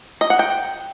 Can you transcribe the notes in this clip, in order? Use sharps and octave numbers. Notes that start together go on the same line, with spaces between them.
D#5
F#5
G5